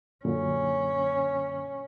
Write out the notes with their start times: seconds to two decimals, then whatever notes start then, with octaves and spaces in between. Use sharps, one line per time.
0.25 F#2 A#2 D3 C#4